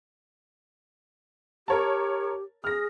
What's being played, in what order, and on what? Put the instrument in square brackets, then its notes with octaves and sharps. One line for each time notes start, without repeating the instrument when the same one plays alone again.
[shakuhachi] G4 [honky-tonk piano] A#4 C#5 A5
[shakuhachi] G#4 [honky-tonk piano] F6 A#6